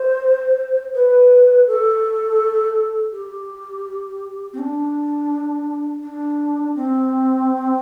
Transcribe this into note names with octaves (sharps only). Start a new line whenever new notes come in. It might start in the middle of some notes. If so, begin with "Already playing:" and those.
Already playing: C5
B4
A4
G4
C4
D4
D4
C4